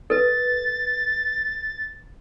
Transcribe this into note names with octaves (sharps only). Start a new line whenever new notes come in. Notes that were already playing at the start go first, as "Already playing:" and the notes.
A4 B4 A6